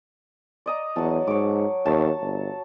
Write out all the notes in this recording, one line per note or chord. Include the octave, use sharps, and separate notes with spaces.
D5 D#5 A#5
E2 F#3 A5
G#2 C#5 D6
D#2 A5 C#6
G1